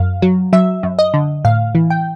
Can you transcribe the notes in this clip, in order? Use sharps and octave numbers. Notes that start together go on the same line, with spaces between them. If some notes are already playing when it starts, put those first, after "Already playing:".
Already playing: F#2 F5
F#3
F#3 E5
F#2
D#5
D3
A2 F5
E3
G5